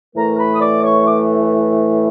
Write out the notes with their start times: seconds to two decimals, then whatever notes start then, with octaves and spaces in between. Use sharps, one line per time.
0.15 A2 E3 A3 A#4 A#5
0.38 B4 B5
0.53 D#6
0.60 D5 D6
0.82 C#5 C#6
1.05 D6